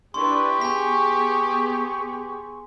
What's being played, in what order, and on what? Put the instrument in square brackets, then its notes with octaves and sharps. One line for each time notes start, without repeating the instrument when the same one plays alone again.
[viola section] D4 E4 B4 [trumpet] G4 [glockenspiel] C6 [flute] C#6
[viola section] B3 G#4 [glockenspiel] G#5 B6